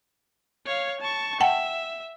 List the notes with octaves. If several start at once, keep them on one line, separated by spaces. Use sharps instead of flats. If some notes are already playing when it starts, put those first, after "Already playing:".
C#5 F5
A5 C#6
E5 F#5 G5 A5